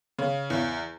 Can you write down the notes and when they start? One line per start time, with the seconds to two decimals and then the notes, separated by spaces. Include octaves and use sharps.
0.19 C#3
0.50 E2